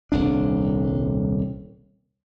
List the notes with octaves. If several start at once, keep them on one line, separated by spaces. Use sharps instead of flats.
D#1 C2 D4